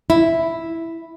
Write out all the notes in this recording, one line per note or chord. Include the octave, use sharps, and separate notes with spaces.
E4